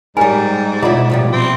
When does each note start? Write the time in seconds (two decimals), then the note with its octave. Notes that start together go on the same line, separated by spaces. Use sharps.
0.17 G#2 G3 A#4 G#5
0.82 B2 E4 F4 D5 D#5 F#5
1.10 A#2 F3 G3
1.33 C4